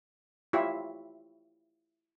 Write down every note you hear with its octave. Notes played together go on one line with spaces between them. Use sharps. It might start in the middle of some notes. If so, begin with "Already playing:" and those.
E4 F4 G4 C#5 E5 F5